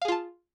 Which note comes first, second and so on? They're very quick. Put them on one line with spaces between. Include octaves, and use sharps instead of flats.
F5 G#4 F4 A5